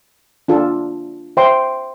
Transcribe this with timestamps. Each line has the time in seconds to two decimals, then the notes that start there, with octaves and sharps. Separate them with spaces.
0.48 D4 F4 A4
1.37 C5 E5 G5 C6